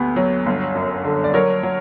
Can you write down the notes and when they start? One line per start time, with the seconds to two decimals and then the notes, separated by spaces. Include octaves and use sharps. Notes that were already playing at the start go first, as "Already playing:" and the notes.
Already playing: D2 B3 G4
0.16 F#3
0.46 G1
0.75 F#2
1.05 D3
1.24 D5
1.34 F#3 A#4 C#5
1.63 F#3